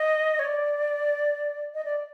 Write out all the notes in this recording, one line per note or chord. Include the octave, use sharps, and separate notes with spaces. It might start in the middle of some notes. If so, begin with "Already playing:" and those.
Already playing: D#5
C#5
D5
D#5
D5